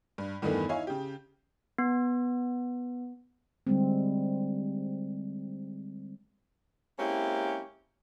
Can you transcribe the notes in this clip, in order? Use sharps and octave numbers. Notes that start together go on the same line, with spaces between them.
G2
E2 G2 D#3 E3 A3 B3
D#4 E4 C#5 F5 G#5
C#3 G4
B3
D3 G3 G#3 C4
G#3 A#3 C4 C#4 E4 G4